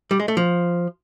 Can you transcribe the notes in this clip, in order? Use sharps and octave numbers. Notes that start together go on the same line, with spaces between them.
G3
G#3
A3
F3